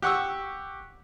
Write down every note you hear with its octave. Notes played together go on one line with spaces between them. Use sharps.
G4 F#5 C#6 E6